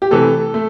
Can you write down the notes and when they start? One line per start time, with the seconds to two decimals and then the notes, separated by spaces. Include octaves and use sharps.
0.02 G4
0.11 C3 E3 A3 A4
0.54 A3